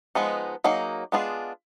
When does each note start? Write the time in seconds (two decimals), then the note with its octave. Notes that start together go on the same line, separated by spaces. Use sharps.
0.15 F3 G#3 B3 D#4
0.64 F#3 A#3 D#4 G#4
1.12 G#3 B3 D4 F4 G#4